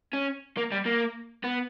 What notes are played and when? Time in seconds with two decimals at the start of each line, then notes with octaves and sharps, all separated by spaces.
0.13 C#4
0.57 A#3
0.72 G3
0.86 A#3
1.44 B3